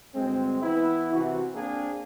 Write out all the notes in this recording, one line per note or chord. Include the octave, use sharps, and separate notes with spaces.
D2 G2 G#3 C4
E3 B3 E4
C3 E3 F#4
A#3 C4 D4 G#4 A#4